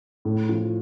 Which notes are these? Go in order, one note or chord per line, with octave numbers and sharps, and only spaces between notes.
A2
F3